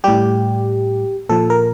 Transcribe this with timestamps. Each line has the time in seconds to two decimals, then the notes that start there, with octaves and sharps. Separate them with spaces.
0.04 A2 G3 G4
1.29 A#2 F3 A4
1.50 A#4